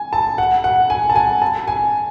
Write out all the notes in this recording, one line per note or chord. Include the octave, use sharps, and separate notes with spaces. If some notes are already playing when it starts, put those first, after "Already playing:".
Already playing: G#5
A5
F#5
F#5
G#5
A5
G#5
A5
G#5